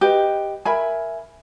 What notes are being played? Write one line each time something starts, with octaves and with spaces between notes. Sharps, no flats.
G4 B4 D#5 G5
A#4 E5 G#5 B5